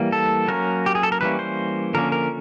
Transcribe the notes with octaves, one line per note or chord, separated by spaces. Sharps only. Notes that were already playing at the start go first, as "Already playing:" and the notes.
Already playing: E3 G3 A#3
A4
F#3 A#3 C#4 A#4
G4
G#4
A4
A#4
E3 G3 A#3 C#4 B4
C5
D3 F3 A#3 C#4 A#4
A#4